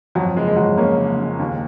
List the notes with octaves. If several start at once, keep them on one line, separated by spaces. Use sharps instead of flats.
F2 F#3
F#1 G#3
G#3
F2 F#3
C#3 A#3 C#4
F#1
F#1
D#2